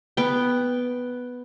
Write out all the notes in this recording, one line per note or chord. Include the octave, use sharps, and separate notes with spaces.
B3 G5